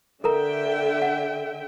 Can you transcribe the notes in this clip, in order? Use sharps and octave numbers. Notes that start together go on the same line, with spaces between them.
D3 A4 A#4 E5 G5 A#5
F#5